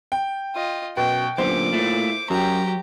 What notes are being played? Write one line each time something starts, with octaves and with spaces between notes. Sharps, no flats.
G5
F4 D#5
F#2 B2 G5
F#2 A#2 D3 B3 C5 D6
A3 E4 F4
F#2 F#3 G4 A#5